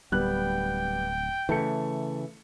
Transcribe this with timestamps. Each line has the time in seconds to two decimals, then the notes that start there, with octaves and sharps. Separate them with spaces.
0.12 D1 G3 B3 G5 F#6
1.49 C#3 E3 A3 A4 C#7